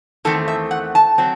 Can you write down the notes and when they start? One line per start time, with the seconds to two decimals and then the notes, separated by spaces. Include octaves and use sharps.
0.25 E2 D#3 A3 C4 A4
0.48 E5
0.71 F#5
0.95 A5
1.18 F#3 C4